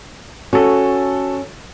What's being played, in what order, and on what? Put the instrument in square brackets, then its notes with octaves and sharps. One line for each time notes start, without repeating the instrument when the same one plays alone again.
[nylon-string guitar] C#4 [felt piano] F#4 A4